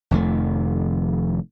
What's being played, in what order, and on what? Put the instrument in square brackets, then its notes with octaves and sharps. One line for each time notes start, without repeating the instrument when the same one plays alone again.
[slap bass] F1 F2 D#3 A3